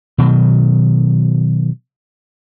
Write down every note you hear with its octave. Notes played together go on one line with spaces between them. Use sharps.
B2 D#3 F#3